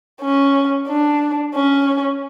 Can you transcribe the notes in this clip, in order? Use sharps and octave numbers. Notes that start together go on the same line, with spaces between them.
C#4
D4
C#4